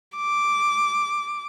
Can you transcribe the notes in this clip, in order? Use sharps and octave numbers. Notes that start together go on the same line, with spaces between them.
D6